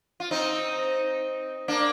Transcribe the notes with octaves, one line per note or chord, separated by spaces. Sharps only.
F4
C4 D#4
A#3 D4